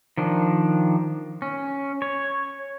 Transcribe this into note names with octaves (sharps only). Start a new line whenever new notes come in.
D#3 F3 D4
C#4
C#5